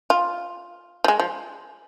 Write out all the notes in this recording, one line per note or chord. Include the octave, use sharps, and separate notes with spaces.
F4
F3
G#3
F3